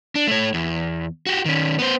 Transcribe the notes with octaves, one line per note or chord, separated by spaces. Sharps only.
D4
A3 C#5
E2
F#4 G4
D#3 C#4
B3 C5